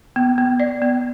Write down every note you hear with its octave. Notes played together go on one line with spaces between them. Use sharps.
B3
B3
D5
B3